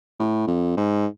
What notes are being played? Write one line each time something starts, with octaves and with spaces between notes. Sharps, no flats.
A2
F2
G#2